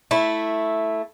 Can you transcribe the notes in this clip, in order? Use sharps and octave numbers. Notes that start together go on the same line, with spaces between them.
A3 E4